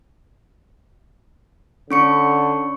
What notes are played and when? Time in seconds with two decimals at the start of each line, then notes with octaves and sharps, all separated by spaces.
1.91 D3 C#4 C#6 C#7